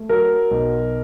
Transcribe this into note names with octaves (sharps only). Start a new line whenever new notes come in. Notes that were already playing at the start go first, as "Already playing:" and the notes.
Already playing: A3
F#3 A#4
B1